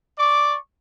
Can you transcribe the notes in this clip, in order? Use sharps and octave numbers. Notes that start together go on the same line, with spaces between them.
D5 C#6 D6